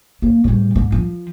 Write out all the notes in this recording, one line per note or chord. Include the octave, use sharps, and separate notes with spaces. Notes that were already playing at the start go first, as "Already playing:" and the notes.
A#3
A2 G3
G#2
F3